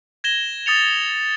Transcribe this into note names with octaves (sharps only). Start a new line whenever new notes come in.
G#6 A#6 E7 G7
D#6 A6 C#7 F7